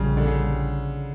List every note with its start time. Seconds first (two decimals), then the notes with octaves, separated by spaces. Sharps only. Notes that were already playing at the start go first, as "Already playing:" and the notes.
Already playing: A#1 A#2 C#3 G3
0.17 D3
0.25 C#3